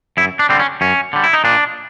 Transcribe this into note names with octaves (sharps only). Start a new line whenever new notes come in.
F#2 E4
D4
D3 G3 C4
C#4
F#2 C#4
D3 G3
E4
D#4
A#2 D4